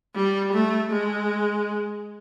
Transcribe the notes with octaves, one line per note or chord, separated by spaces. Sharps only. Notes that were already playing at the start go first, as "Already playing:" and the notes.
G3
A3
G#3